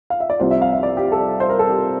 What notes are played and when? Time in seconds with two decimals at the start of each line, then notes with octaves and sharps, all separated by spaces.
0.10 F5
0.20 E5
0.30 D5
0.40 C2 C3 F3 C5
0.51 E5
0.62 F5
0.73 E5
0.83 D5
0.97 G4
1.12 A4
1.40 C5
1.49 A#4
1.59 A4
1.70 G4